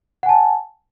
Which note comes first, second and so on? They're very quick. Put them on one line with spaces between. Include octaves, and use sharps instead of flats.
F#5 G#5 A5